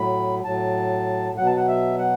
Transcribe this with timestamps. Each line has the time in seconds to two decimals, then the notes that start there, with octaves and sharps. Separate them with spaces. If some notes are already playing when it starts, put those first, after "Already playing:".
Already playing: A2 F#3 B5
0.44 A2 F#3 A5
1.37 B2 F#3 F#5
1.46 A5
1.56 F#5
1.68 E5
1.99 F#5